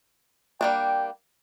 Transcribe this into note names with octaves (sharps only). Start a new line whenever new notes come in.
G3 A#3 D4 G5